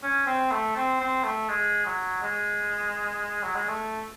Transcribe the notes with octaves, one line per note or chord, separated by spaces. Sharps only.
C#4
C4
A3
C4
C4
A3
G#3
F#3
G#3
F#3
G#3
A3